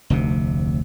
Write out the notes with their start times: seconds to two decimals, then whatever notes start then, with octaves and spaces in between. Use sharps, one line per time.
0.10 F1 D2 C3